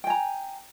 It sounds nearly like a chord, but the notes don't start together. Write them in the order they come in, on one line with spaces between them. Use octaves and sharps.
G5 G#5 A#5